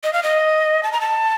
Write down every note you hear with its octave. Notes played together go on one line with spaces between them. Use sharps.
D#5
F5
D#5
A5
A#5
A5